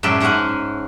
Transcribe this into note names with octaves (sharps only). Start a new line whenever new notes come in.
F#2 A2 G#3 C#4 D5 E5
G#2 G#3 C#4 A#4 E5 F#5